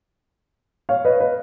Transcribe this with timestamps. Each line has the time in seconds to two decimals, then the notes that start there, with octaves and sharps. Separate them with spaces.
0.89 C#5 F5
1.05 B4 D#5
1.20 B4